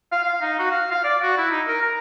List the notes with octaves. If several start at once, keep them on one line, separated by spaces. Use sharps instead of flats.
F5
F5
D#4
F#4
F5
F5
D5
F#4
E4
D#4
A#4
A#5